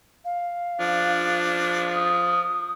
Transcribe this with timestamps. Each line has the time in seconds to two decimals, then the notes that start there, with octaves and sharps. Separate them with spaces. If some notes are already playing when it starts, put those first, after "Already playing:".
0.25 F5
0.80 F3 D4
1.94 D#6